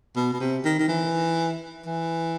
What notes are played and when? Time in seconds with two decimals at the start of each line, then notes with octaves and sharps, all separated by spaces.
0.16 B2
0.33 B2
0.40 C3
0.65 D#3
0.79 D#3
0.89 E3
1.86 E3